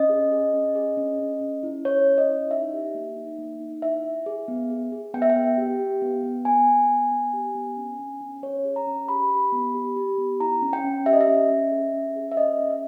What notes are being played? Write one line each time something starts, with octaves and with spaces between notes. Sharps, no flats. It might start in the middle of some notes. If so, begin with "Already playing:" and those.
Already playing: C#4 D#5
G#4
G#4
C#4
G#4
C#4
C#4
C#4
E4
C#4 C#5
C#4
D#5
E4
D#4 E5
G4
A#3
D#4
A#3
D#4
E4 E5
E4
G#4
B3
G#4
G#4
B3 G5
E5
G5
B3
G4
G4
B3
B3
B3 G#5
B3
B3
B3
G4
B3
C#4
C#4
C#4
C#4 C#5
G#4
A#5
C#4
G4 B5
G4
B3
G4
G4
B3
E4 A#5
C#4
G5
C#4
G4 E5
D#5
E5
C#4
C#4
G#4
C#4
G#4
E5
C#4 D#5
C#4
E5